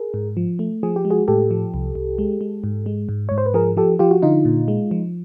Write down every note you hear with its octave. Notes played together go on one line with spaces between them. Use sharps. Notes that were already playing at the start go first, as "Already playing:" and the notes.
Already playing: G#4 A#4
G#2
F3
A3
F3 G#4
G4
G#3
F#4 G#4
A2 G4 A4
F3
C2
C2
G#3
G#3
G#2
G#3
G#2
G#2 C#5
C5
B4
F3 G#4 A#4
F3 G4 A4
F3 F4 G4
F#4
D3 D#4 F4
A#2
G#3
F3